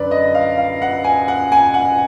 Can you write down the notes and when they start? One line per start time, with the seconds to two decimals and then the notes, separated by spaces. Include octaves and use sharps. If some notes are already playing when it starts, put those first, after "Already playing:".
Already playing: F#2 D3 B4 D5
0.11 D#5
0.34 F5
0.58 F5
0.82 F#5
1.04 G#5
1.28 F#5
1.52 G#5
1.74 F#5